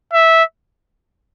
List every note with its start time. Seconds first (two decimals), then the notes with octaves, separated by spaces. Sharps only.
0.13 E5